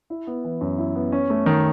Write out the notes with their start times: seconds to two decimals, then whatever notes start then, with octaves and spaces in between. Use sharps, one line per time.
0.10 E4
0.27 B3
0.44 E3
0.61 F#2
0.78 E4
0.96 B3
1.12 C#4
1.30 A3
1.46 D#3